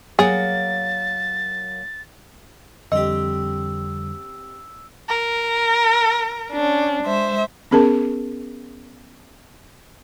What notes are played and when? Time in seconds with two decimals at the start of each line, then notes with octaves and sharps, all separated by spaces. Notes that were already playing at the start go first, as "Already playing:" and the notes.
0.19 F#3 A#3 G#4 F#5 A6
2.92 F2 D3 G3 C4 G4 D#5 E6
5.09 A#4
6.51 C#4 D4
7.03 G#3 C5 E5
7.71 B3 C#4 G#4 A#4 A5